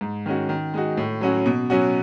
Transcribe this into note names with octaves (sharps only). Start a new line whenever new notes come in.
G#2
D#3 G#3 C#4 F#4
D#3
G#3 D#4 F#4
A2
F#3 C#4 F#4
B2
F#3 C#4 F#4